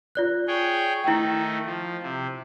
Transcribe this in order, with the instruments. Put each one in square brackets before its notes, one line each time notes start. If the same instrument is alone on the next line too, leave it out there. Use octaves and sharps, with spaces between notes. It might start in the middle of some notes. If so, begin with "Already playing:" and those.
[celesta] F4 D5 F#6
[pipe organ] G#4 C#5 G5
[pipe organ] D#3 A3 [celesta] E4 G5
[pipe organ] F3
C3